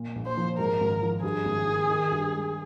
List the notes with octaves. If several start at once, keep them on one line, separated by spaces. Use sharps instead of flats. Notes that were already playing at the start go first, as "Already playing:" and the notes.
Already playing: A#2
A#1
C5
F3
G#2 A#4
G#1
F3
G2 G#4
G#1
D#3
D#3
G2
G#3